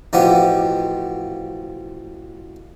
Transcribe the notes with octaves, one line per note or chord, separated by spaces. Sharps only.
A1 B2 F3 B3 G4 F#5